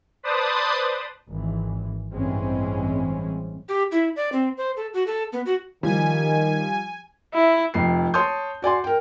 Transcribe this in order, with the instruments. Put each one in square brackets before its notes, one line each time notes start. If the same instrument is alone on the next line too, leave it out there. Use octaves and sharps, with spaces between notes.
[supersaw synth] B4 C5 D5 A5 D#6
[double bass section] G#1 E3
A1 G2 E3 G#3 C4 C#4
[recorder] G4
E4
D5
C4
C5
A4
F#4
A4
B3
F#4
[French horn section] D#3 [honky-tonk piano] F3 G3 [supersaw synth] G#5
[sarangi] E4
[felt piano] F1 F2 C7
C#5 A5 C6 D#6 G6
F#4 D5 G#5 C6
A#4 G5